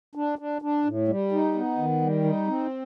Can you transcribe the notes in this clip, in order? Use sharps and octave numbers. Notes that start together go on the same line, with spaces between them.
D4
D4
D4
A2
G3
D#4
B3
D#3
G3
D#4
C4